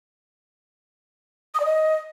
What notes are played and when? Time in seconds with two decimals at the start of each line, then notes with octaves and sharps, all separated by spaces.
1.54 D#6
1.60 D5
1.65 D#5